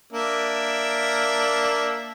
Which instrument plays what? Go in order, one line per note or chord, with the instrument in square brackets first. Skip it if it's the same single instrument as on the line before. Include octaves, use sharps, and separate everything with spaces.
[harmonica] A#3 D4 E5